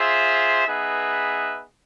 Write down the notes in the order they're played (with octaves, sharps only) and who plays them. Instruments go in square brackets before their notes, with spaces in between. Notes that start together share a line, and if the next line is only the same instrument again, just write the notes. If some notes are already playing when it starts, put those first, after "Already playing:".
Already playing: [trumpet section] F4 G#4 C5 E5
B3 D#4 G#4 B4 E5